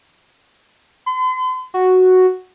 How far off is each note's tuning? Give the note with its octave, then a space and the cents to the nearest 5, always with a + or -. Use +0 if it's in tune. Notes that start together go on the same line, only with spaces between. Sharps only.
C6 -45
F#4 +0